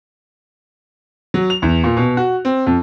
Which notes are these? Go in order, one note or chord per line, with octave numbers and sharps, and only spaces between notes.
F#3
F7
E2
A#2
B2
F#4
C4
F2